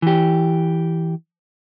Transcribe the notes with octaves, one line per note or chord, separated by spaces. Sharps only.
E3 G4